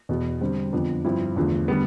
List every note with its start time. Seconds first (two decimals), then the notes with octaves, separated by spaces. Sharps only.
0.09 E2 B2 B3
0.41 D3 G3 C4
0.73 F2 D3 F3 B3 D4
1.05 G2 F3 C4 E4
1.36 E2 D3 F3 A3
1.68 D3 G3 B3